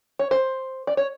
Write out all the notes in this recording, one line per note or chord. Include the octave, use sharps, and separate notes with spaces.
C#5
C5
D5
C#5